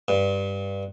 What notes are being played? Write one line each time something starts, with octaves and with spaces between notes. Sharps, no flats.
G2